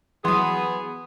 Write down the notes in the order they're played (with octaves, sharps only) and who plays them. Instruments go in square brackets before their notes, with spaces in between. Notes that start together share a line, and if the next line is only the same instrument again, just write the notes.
[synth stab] E3 F#3 [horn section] B3 G#4 [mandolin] C6 D#6